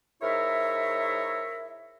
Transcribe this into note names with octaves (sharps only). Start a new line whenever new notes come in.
G#2 E4 A#4 C#5 E5